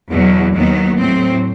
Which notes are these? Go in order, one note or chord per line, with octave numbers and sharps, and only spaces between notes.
E2 B2 F#3
D#2 D#3 F#3 B3
A2 F#3 C4